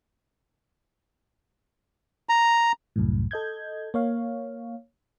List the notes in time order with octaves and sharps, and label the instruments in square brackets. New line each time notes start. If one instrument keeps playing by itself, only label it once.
[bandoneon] A#5
[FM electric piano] C2 F#2 A2
A4 D#5 G6 G#6
A#3 C#5 F5